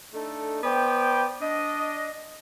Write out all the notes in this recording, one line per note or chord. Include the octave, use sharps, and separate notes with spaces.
A3 D4 D#4 A4
B3 C5 D5 G5
D4 D#5